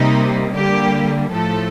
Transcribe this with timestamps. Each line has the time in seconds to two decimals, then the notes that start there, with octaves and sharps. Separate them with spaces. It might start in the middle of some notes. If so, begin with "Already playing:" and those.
Already playing: C3 G3 A#3 D#4
0.55 D3 G3 A#3 G4
1.31 A2 F3 A3 A4